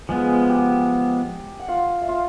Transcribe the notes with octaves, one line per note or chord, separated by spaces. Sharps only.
F3 G#3 B3 G#4 G#5
G4 G5
F#5
F4 F5
E5
F4 F5